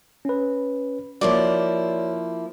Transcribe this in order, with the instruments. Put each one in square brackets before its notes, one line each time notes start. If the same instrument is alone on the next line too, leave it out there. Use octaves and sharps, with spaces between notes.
[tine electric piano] C#4 B4
[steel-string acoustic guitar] F3 A#3 E4 [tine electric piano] F#4 C#5 [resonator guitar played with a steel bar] D5